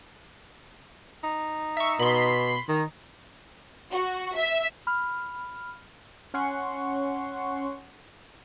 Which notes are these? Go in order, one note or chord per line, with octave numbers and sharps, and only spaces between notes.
D#4
E5 C#6
B2 B5 C6
D#3 D#4
F#4
E5
B5 F6
C#4 F#5 C6 C#6